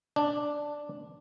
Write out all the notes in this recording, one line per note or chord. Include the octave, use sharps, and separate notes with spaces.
D4